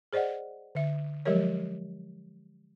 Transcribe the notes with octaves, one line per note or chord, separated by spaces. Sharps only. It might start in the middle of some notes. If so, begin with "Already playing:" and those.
G#4 C5 D5 D#5 F#5
D3 E5
F3 F#3 G#3 G4 A#4 C#5